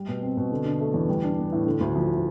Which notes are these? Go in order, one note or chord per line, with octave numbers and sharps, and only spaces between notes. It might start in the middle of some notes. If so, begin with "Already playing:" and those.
Already playing: G3
B2
C4
B2
D3
D4
A3
E2
G3
D4
B3
A2
D3
D2
F3